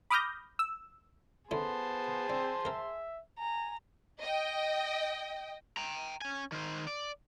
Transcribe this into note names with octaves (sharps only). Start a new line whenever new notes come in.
B5 D6 D#6 F6 G6 A#6
E6
D3 B3 C#4 E4 G#4 C5 A5 C6
C4 D4
C4 A#4 E5
G#5 A#5
D#5 G5
G5 A#5
C#4 G#5
D#3 C5
D5